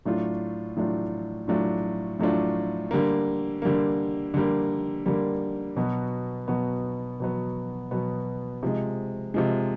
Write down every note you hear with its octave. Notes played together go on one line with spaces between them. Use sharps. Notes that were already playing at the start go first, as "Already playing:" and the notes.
A2 F#3 A3 D4 F4
A2 F#3 A3 D4 F4
A2 F#3 A3 D4 F4
A2 F#3 A3 D4 F4
D3 G3 A#3
D3 G3 A#3
D3 G3 A#3
D3 G3 A#3
B2 F#3 B3
B2 F#3 B3
B2 F#3 B3
B2 F#3 B3
C3 F3 G#3
C3 F3 G#3